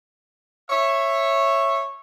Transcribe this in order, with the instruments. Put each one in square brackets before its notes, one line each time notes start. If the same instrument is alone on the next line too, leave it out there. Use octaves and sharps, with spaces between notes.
[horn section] C#5 E5